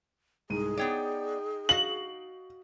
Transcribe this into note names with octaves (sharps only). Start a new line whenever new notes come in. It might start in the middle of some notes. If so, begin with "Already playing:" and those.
C2 G#2 G#4 D#7
B3 D#4 C#5 D5 G5
F#4 D#5 F5 F#7